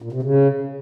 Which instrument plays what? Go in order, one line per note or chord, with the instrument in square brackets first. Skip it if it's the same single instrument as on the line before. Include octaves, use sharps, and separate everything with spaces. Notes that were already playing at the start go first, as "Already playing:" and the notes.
[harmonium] A#2
C3
C#3